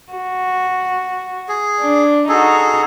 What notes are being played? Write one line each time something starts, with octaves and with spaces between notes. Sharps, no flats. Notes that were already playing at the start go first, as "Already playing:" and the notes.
F#4
G#4
D4
D#4 F#4 G#4 A4